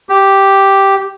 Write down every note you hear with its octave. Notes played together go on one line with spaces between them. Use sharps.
G4